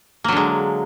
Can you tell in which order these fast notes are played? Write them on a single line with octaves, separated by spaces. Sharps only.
A#3 F#3 D3 G#3